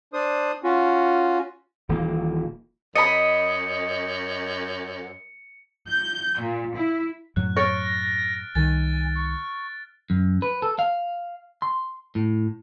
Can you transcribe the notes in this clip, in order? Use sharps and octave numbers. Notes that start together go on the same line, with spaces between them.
D4 C5 D#6
C#4 F4 F#4
D#1 E3 A#3
F#2 D#5 B5 C#7
G6
A#2
E4
F#2 A2 F#3 F#6
C#5 F6 A6 A#6 D7
C2 D#3 G#5 A6
C#6
F#2
B4
A4
F5
C6
A2